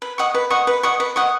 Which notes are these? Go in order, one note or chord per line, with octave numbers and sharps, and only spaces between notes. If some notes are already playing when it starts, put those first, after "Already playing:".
B4
D#5 F#5 C#6
B4
D#5 F#5 C#6
B4
D#5 F#5 C#6
B4
D#5 F#5 C#6